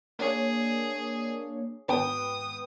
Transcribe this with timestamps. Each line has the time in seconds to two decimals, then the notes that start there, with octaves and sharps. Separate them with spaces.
0.19 A#3 D4 G#4 C#5
1.88 G#1 B3 B4 G5 D#6